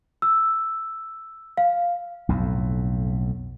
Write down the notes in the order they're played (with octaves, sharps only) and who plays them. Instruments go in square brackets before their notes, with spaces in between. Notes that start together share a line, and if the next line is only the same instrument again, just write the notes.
[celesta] E6
F5
[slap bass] B1 F2 A2